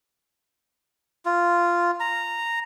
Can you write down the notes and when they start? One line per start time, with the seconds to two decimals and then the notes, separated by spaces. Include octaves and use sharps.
1.26 F4
2.00 A#5